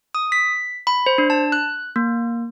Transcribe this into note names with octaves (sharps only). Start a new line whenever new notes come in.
D#6
B6
B5
C5
D4
A5
F#6
A#3